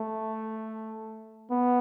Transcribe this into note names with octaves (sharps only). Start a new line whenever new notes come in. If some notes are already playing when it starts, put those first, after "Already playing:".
Already playing: A3
B3